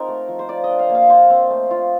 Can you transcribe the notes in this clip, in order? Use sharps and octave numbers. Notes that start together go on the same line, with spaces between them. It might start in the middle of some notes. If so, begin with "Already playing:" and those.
Already playing: C4 D#4 F4 A#4
A3
F3
C5
F4 D5
D#5
D4
F5
A#3
F5
F4 C5
C4
A3
F4